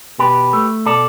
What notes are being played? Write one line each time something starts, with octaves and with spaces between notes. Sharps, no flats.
B2 G4 B4
A3
B2 A4 D5